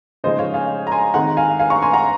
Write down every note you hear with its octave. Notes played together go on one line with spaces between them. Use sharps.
C#3 F3 G#3 D#4 C5 D#5
C#5 F5
F5 G#5
A#5
G#5 C6
D#3 G#3 C4 D#4 F#5 A#5
F5 G#5
F5 G#5
A#5 C#6
G#5 C6
F#5 A#5